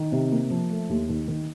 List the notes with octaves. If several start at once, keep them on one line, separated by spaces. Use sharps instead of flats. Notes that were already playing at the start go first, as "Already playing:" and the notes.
Already playing: D#3
C3
A#3
F3
A3
D#2
D#3
D#3